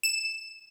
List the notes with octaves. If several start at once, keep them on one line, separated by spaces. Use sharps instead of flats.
E7